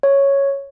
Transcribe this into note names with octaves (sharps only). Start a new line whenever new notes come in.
C#5